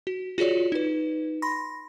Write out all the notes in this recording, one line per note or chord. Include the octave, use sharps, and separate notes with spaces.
F#4
F4 F#4 G#4 C#5 D5
D#4 B4
B5 C6 A#6